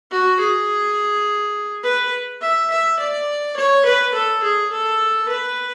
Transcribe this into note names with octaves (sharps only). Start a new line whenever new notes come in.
F#4
G#4
B4
E5
E5
D5
C#5
B4
A4
G#4
A4
B4